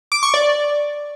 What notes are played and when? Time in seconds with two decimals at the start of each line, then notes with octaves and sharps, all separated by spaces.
0.12 D6
0.23 C#6
0.34 D5